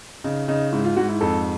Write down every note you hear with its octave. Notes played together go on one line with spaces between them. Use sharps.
C#3 D#4
C#3 D#4
G#2 E4
F4
G#2 F#4
E4
F2 A4